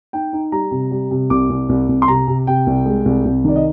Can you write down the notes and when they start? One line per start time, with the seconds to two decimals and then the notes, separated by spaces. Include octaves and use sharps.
0.13 D#4 G5
0.33 D#4
0.52 G3 A#5
0.71 C3
0.91 G3
1.11 C3
1.30 C2 D6
1.50 C2
1.69 C2
1.89 C2
2.02 C6
2.08 C3 A#5
2.28 C3
2.47 C3 G5
2.67 C2
2.86 G#3
3.05 C2
3.25 C2
3.45 D#3 D5
3.56 D#5